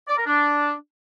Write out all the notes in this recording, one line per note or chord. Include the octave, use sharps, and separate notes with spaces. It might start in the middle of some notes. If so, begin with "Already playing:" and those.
D5
A#4
D4